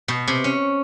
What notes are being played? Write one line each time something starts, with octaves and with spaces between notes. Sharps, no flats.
B2
C3
C#4